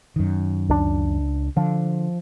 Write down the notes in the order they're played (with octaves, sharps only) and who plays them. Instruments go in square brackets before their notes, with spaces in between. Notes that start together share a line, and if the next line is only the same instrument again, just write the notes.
[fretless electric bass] F#2 D#3
[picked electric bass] C#2 D4
[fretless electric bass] D3 [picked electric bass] F3